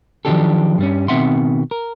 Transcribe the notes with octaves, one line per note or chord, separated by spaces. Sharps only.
D#3 F3 F#3 D4 G4 A4
G2 G3 C#4
B2 D#3 C4 E5 F#5 C6
A#4